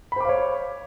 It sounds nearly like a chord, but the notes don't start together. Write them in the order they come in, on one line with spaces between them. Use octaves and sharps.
B5 C5 D6 F5 C#5